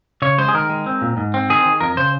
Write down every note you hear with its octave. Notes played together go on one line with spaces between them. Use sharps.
C#3 C#5
G#3 C5
G#4
D#3 A#4
G#3
C4
A#2
G#2
C4
D#3 G#4
D#3
F2 A#4
C#3 C5